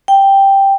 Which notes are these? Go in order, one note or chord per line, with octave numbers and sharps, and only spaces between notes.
G5